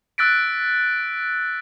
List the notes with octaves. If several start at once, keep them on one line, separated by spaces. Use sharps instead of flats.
E6 F#6 A6 B6 D7